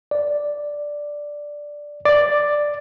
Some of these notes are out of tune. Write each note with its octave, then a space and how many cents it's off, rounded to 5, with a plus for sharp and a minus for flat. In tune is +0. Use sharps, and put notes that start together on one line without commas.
D5 +0
D5 +5